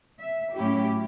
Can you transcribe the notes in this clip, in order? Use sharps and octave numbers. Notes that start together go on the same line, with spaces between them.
E5
A2 F#3 C#4 E4 G4